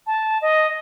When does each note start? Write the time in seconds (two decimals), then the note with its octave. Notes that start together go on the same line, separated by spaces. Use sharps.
0.07 A5
0.42 D#5